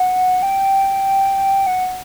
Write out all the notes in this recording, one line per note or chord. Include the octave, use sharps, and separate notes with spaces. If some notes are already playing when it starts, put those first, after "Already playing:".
Already playing: F#5
G5
F#5